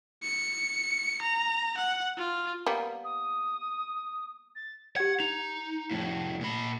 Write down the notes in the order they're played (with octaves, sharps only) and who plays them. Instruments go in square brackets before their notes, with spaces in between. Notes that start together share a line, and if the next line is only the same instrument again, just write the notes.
[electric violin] C#7
A#5
F#5
F4
[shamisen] G3 A#3 B3
[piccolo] D#6
A6
[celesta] G4 G#6 [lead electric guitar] F#5
[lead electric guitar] D#4 [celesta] F7
[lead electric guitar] F2 A2
A#2 B5